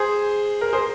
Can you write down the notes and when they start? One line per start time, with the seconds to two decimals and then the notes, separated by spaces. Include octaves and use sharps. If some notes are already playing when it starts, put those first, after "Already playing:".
Already playing: G#4 C5
0.61 A#4
0.73 G#4 C5